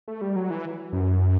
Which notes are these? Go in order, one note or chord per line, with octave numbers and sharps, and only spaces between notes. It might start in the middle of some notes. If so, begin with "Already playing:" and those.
A3
G3
F#3
E3
F#2